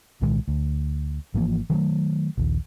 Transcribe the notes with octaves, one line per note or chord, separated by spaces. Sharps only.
C2 A#2 D#3 G#3
D2
G#1 E3 F3 A#3
D#3 F#3 G3 A3
A#1 D#2